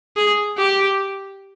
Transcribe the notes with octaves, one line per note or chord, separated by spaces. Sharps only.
G#4
G4